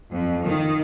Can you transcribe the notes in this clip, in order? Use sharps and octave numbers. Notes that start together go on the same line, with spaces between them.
F2
D#3